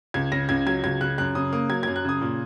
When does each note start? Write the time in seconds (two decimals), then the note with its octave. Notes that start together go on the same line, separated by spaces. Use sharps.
0.14 C#2 G#6
0.32 C#3 A#6
0.49 C#2 G#6
0.66 F#3 G#6
0.84 C#2 G#6
1.01 C#3 F#6
1.18 F#2 F#6
1.35 C#3 D#6
1.53 A#3 D#6
1.70 F#3 G#6
1.83 F#2 G#6
1.96 F#6
2.05 C#3 D#6
2.21 A#2